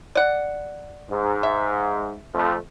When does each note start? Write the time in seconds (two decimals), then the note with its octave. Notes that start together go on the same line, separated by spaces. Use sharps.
0.15 D5 F#5
1.10 G#2
1.43 E5
2.34 F2 A3